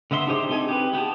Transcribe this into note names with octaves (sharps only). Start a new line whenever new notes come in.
D3 B3 E5 C6
D4 D#4 G4 G#4 C5
C4 D#4 A4 G#5
G4 B4
B3 G4 G#4 A5